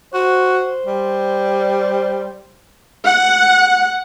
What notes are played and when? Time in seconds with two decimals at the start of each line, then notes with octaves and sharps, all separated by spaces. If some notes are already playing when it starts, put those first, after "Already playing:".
0.14 F#4 C5
0.85 G3
3.04 F#5